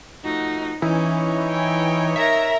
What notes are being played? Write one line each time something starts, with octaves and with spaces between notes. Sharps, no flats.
F3 A3 D#4 F#4
E3 C#4 D#4 C#5
G5 G#5
A#4 E5 A#5